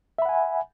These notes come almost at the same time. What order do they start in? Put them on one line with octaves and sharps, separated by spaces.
E5 B5 F#5 G#5